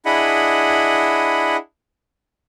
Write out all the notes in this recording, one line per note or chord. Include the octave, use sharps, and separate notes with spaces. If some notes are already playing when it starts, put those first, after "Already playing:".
D4 E4 G#4 D#5 F#5 B5